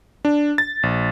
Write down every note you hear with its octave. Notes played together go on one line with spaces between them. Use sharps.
D4
A6
A#1